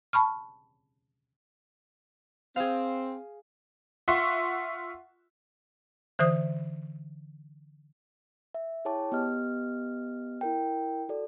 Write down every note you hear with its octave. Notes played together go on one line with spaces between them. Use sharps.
A5 B5 C#6 F6
C4 G#4 F5
F4 E5 F#5 C6 C#6
D3 E3 C5 D#6
E5
E4 G#4 C#5 G5 A5 D6
B3 G4 D#5 F6
E4 A#4 G5
F#4 A4 D5